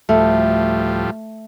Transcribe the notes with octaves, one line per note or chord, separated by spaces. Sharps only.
D2 A2 F3 G3 A3